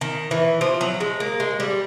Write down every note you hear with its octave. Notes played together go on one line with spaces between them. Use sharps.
D#3
E3
F3
F#3
G#3
A#3
G#3
G3